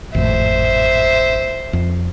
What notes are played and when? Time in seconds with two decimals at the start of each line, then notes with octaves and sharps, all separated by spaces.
0.15 G#1 F2 A2 C5 E5
1.73 F2